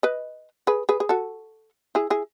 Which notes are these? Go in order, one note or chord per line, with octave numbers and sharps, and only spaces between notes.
B4 D#5
G#4 B4
G#4 B4
G#4
F#4 A4
E4 G#4
E4 G#4